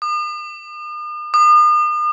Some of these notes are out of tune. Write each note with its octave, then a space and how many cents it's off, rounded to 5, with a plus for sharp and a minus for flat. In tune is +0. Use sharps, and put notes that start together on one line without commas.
D#6 -45
D#6 -40